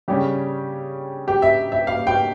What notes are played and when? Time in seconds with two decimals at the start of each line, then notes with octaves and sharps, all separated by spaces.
0.08 C#3 G3 C#4 G4
1.28 G4
1.42 E5
1.72 E5
1.87 F5
2.07 G5